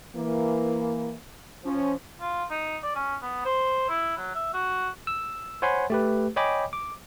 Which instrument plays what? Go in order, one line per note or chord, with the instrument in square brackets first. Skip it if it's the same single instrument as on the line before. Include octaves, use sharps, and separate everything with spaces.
[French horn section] E3 A#3
F3 C#4 F4
[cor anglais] F4
D#4
D5
C#4
B3
C5
E4
F#3
E5
F#4
[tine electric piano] E6
C5 C#5 F#5 G#5 B5 C6
A3 G4 B4
C#5 D#5 G5 G#5 B5 D6
D6